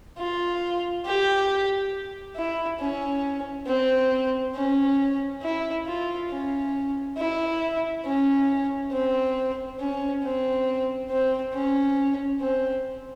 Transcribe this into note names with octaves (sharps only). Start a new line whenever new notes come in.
F4
G4
E4
C#4
C4
C#4
E4
F4
C#4
E4
C#4
C4
C#4
C4
C4
C#4
C4